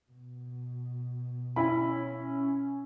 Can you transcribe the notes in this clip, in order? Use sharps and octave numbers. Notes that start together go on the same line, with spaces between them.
B2
C#4 E4 B5